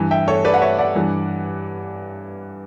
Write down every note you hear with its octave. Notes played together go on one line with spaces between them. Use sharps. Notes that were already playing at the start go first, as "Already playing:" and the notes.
Already playing: G2 E3
E5 G5
A4 C#5
B4 D5
F#5
C#5 E5
D5 F#5
G2 E3